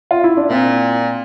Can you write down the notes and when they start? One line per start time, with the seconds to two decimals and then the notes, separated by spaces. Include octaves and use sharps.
0.11 F4
0.24 E4
0.37 D4
0.50 A#2 C4